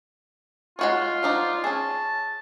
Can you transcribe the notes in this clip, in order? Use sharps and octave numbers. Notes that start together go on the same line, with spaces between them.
G#3 F4 F#4 C#5
F3 D4 D#4
C#4 G#4 A5